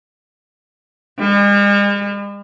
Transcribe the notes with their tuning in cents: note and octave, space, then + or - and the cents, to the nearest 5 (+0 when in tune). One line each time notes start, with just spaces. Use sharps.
G#3 -45